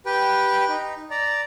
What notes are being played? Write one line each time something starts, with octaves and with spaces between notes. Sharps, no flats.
G4 B4 G5
D#4
D5 A#5